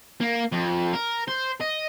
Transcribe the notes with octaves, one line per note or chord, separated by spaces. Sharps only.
A#3
F2
A#4
C5
D#5